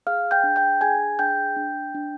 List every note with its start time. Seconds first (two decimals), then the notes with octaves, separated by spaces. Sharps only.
0.07 G#4 F5 F6
0.31 G5 G6
0.43 D4
0.56 G5 G6
0.81 G#4 G#5 G#6
1.19 D4 G5 G6
1.56 D4
1.95 D4